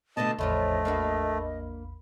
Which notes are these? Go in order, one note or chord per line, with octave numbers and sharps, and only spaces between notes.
B2 D3 A3 B3 D#5 A5
A1 E2 D3 F3 A3 C#4 D#5 B5
A#3 D4 F#4